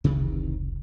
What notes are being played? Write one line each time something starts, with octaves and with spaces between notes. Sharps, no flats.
F1 C#2 C3 D#3 E3